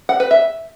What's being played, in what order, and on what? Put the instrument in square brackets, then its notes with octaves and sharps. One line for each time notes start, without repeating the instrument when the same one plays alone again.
[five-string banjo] F#5
B4
E5